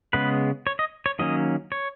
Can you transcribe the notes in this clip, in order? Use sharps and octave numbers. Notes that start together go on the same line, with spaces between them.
C#3 G#3 B3 B4
C#5
D#5
C#5
D#3 F#3 A#3 C#4 D#5
C#5